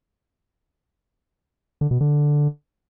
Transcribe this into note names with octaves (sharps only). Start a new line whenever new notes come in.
D3
B2
D3